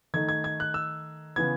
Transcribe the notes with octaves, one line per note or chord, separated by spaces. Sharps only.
D#3 A3 D#4 G#6
G#6
G#6
F#6
E6
C#3 E3 B3 G#6